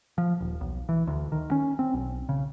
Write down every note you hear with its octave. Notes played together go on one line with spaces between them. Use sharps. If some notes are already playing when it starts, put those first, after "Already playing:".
F3
D#1
B1
E3
D2
D#3
C#4
C4
B1
C#3